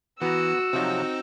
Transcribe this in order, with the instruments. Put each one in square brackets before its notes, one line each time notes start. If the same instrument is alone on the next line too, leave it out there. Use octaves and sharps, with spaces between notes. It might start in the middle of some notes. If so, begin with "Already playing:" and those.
[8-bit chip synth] E3 [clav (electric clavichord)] B3 A#5 [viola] F#4 [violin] E6
[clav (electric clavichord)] C3 F3 F#3 [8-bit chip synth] C4 D#4